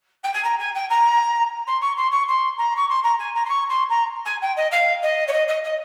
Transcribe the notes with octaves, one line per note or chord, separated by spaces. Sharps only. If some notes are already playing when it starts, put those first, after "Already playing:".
G5
G#5
A#5
G#5
G5
A#5
C6
C#6
C6
C#6
C6
A#5
C#6
C6
A#5
G#5
A#5
C6
C#6
C6
A#5
G#5
G5
D#5
F5
D#5
C#5
D#5
D#5
D#5